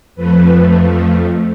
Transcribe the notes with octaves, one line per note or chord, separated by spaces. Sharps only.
F2 F3 A3 B4